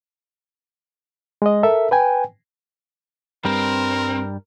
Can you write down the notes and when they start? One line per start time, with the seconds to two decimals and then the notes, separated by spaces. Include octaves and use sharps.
1.42 G#3 D#5
1.63 A4 A#4 E5
1.91 B4 G5 G#5
3.45 G2 G3 C4 A#4